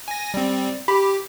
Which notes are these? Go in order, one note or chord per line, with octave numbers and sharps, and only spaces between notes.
G#5 A#6
G3 C4
G4 B5